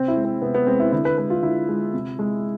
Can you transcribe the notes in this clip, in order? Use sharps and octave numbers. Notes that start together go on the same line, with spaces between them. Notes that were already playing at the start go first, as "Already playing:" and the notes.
Already playing: C3 C4
E4
G#3
C4
C3 B3
B3
G#3 C4
E4
D3 E4
B4
G#3 B4
F4
D3 E4
G#3
C3
G#3